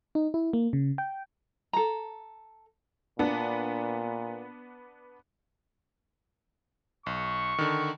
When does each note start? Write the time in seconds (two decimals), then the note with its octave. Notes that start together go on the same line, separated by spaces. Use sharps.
0.15 D#4
0.34 E4
0.53 A#3
0.73 C#3
0.98 G5
1.73 A4 A#5
3.19 A#2 B3 D4
7.06 B1 C#6
7.58 D3 D#3